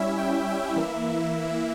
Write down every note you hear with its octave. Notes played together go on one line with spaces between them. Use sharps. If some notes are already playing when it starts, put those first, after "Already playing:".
Already playing: G3 C#4 E4 E5
G5
E5
E3 A#3 E4